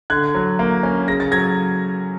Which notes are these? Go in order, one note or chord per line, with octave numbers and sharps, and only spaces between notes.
D3 F#6 G#6
F#3
A#3
C#4
C#3 A#6
A6
F#3 G#6 A#6